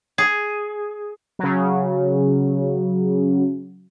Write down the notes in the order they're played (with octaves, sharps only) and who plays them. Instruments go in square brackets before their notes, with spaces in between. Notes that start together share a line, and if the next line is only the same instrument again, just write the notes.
[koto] G#4
[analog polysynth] C#3 F#3